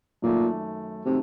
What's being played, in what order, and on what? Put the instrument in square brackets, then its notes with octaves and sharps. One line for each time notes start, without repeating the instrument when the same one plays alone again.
[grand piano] F#2 D#3 F#3 A3 [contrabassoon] A#2
[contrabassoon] C3 [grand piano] D#3 F#3 A3